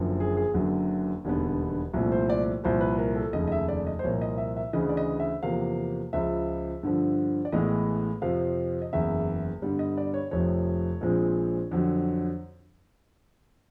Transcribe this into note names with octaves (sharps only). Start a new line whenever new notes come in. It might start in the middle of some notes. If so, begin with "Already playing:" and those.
Already playing: F#1 F#2 D3 F3
G#4
G#4
F#1 F#2 D3 F#3
E1 D#2 D3 G3 B3
C2 A#2 F3 A3 C4
C5
D5
C2 A#2 F3 C5
B4
A#4
A4
F1 D#2 C#3 D#5
D#5
E5
D5
D#5
C5
C2 A#2 F3 A#3 C#5
D#5
E5
E5
D2 C#3 E3 D#5
D5
D#5
E5
E2 C3 F3 A#3 F5
C#2 C#3 F3 E5
G2 D3 F3
D5
A1 A2 E3 G#3 B3 D#5
F2 C3 F3 F5
D#5
F#1 E2 C#3 E5
G2 D3 G3 B3
D#5
D5
C#5
F1 F2 C3 F3 C#5
A#1 A#2 F3 G#3 C4
F2 D3 F#3